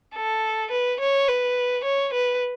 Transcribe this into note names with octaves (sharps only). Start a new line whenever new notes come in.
A4
B4
C#5
B4
C#5
B4